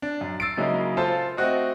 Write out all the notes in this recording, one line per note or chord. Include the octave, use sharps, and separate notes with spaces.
D4
F#2
E6 A6 C7 D7
C#3 F#3 G#3 A#3 D#4 E4
F4 A4 C5 F5 A5 C6
A3 C4 F#4 D#5